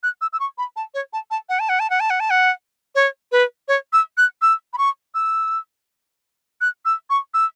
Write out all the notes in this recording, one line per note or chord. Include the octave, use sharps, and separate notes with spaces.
F#6
E6
E6
C#6
B5
A5
C#5
A5
A5
F#5
A5
F#5
A5
F#5
A5
F#5
A5
F#5
C#5
B4
C#5
E6
F#6
E6
B5
C#6
E6
F#6
E6
C#6
E6